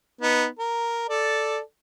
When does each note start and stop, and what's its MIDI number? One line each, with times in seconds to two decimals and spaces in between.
0.21 0.46 59
0.21 0.46 63
0.59 1.08 70
1.09 1.59 69
1.09 1.59 74